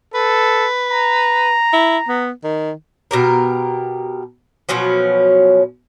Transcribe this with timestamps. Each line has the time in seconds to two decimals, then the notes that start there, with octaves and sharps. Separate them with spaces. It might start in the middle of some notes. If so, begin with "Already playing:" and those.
0.14 A4 B4
0.89 A#5
1.73 E4
2.09 B3
2.44 D#3
3.11 B2 G4 A#4
4.69 B2 F3 F#3 C#4